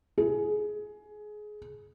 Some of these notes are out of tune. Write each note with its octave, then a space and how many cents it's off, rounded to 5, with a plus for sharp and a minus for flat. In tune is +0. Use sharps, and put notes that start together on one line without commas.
G#4 +20